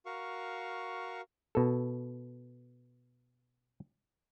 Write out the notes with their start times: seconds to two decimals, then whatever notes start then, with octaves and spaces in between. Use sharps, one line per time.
0.06 F#4 A#4 F5 C#6
1.55 B2 A4